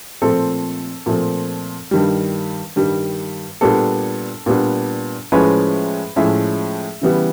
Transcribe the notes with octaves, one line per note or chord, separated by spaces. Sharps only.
A#2 F3 A3 C4 A4
A#2 F3 A3 C4
G2 D#3 G3
G2 D#3 G3
A#2 G3 B3 D4 A4
A#2 G3 B3 D4
A2 F3 G#3 C#4 B4
A2 F3 G#3 C#4 E5
C#3 E3 G3 B3